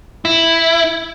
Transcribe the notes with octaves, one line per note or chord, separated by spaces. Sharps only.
E4